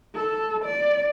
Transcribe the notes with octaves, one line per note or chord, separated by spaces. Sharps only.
A4
D5